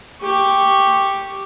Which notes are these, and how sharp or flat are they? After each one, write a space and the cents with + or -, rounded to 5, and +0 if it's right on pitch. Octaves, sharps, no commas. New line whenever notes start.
G4 +0 C#6 +0